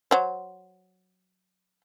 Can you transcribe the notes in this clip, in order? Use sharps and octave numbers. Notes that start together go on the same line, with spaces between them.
F#3 C5